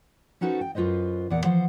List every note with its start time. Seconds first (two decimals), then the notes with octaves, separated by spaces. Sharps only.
0.41 C#4 D#4 F#4 A4 B4 C5
0.61 G5
0.75 F#2 F4 B4 C5 D#5
1.30 E2 A#2 D5 F#5
1.44 E3 F3 C5 F#5